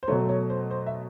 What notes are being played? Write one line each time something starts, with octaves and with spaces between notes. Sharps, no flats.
C5
B2 F#3 A3 C#5
C#5
C5
C5
E5